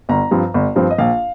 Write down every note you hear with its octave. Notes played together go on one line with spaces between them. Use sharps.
G1 A#5
G2 F3 C4
G1
G2 F3 C4
D#5
A#1 F5